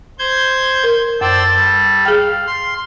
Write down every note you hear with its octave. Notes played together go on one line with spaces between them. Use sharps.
C5 G6 G#6
A#4
F#2 A4 C5 D5 E6
G3
G#4 F5 G5
C6